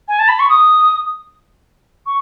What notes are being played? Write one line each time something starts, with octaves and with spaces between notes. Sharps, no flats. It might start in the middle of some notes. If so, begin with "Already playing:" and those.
G#5
A5
B5
C#6
D#6
C#6